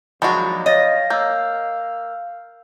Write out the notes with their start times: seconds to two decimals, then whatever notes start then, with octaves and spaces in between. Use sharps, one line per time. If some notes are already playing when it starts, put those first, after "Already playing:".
0.22 D#2 F3 F#3 G#3 D4 F#4 B5
0.66 C#5 D#5 F5 A6 A#6
1.10 A#3 E6 G6